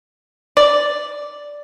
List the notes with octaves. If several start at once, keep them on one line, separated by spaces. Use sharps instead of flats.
D5